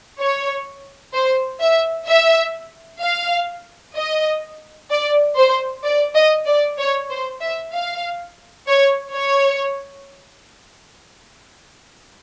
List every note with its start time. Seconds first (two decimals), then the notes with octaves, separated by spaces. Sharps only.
0.20 C#5
1.14 C5
1.60 E5
2.08 E5
3.02 F5
3.96 D#5
4.90 D5
5.37 C5
5.84 D5
6.15 D#5
6.47 D5
6.78 C#5
7.10 C5
7.41 E5
7.73 F5
8.67 C#5
9.14 C#5